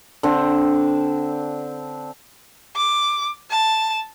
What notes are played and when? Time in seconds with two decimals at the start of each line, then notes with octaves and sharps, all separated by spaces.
0.23 D3 C4
2.76 D6
3.51 A5